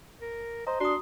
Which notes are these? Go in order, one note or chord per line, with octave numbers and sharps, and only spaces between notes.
A#4
C5 D#5 A#5
D4 F#4 C6 D#6